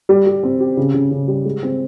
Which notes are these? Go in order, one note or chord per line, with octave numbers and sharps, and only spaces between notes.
G3
G3
C4
G4
C#3
C#3
C#3
G3
G#3
C4